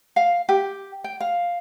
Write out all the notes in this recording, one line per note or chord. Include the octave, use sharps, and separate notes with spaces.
F5
G4
G5
F5